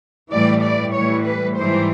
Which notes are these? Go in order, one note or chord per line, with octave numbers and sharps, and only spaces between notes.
A2 E3 G3 D5
D5
A2 E3 G3 C#5
B4
G#2 E3 G3 C5